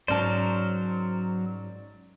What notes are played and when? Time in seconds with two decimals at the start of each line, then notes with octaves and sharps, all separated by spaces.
0.08 G#2 F#3 C#4 A#4 C5 D5 A5